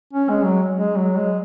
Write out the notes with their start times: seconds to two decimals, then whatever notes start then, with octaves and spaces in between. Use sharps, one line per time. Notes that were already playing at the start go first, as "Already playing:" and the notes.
0.13 C#4
0.29 G#3
0.44 F#3
0.75 G#3
0.96 F#3
1.16 G#3